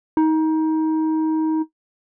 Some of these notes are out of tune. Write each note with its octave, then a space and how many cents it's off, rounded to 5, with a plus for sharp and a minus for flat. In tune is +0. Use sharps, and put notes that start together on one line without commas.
D#4 +25